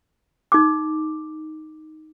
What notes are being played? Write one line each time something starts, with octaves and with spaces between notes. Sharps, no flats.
D#4 D6